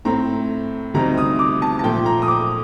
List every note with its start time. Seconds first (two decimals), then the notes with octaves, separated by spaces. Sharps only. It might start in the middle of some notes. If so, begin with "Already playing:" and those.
0.05 A2 A3 C4 A#5
0.94 D2 C3 G3 C4 D#4 A#5
1.18 D#6
1.39 D6
1.62 A5
1.79 A5
1.84 A#2 F3 A3 G5
2.06 A#5
2.22 D#6
2.28 D6